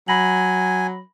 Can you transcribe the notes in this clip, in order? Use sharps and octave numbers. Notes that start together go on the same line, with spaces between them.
F#3 G#5 B5 A#6 F#7